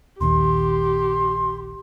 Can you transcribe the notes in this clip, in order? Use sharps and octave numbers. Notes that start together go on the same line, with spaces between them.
D#1 A#1 D#2 G4 C6